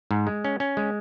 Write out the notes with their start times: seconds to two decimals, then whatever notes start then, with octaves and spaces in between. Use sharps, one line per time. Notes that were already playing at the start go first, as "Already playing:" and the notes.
0.11 G#2
0.27 G#3
0.44 C#4
0.60 C#4
0.77 G#3